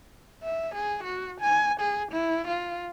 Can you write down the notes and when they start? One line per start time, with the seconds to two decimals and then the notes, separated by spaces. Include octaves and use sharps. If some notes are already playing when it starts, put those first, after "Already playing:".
0.44 E5
0.75 G#4
1.04 F#4
1.41 G#5
1.80 G#4
2.12 E4
2.48 F4